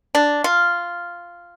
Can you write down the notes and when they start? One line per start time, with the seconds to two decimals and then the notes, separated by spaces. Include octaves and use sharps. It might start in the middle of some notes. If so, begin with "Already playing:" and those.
0.15 D4
0.44 F4